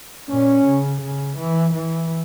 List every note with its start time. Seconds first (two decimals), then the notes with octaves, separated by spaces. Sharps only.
0.29 A#2 C#4
0.65 C#3
1.01 C#3
1.37 E3
1.73 E3